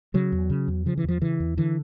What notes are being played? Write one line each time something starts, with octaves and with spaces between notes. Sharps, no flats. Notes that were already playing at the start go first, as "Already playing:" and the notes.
C#3 F#3
E2
C#3
E2
C#3 F3
E3
E2 F3
C#3 E3
E2
D3 E3